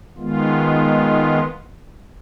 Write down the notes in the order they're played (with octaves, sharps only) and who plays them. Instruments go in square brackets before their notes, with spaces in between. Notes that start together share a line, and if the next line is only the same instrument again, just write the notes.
[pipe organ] D#3 G#3 B3 F4